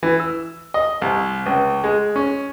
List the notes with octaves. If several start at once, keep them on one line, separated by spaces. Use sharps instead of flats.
E3
E6
D#5
C2
C#2
G#3
C#4